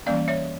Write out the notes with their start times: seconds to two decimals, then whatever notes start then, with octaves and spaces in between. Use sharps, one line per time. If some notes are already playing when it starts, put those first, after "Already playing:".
0.06 E3 G3 A#3 C#4 D5 F5
0.28 C#5 E5